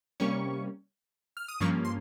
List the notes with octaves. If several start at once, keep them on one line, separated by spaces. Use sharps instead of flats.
C3 G3 A#3 C#4 C#6
F6
D#6
G2 F3 A#3 C#4 C#6
C6